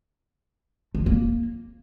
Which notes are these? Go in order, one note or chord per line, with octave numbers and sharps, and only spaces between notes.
A3
F4
A#3